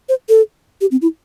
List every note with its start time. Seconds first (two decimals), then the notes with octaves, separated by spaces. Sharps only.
0.09 C5
0.29 A4
0.81 G4
0.91 C4
1.02 E4